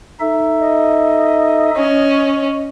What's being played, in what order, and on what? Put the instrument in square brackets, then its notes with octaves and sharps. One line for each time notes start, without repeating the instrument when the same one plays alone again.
[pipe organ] D#4 A4 E5
[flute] D#5
[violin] C#4